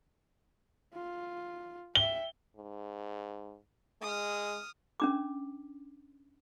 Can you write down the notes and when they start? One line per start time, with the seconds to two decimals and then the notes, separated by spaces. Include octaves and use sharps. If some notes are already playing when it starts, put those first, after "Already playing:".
0.95 F4
1.95 E5 G5 G7
2.56 G#2
4.02 G#3 D#6 F6
5.00 C#4 D4 D6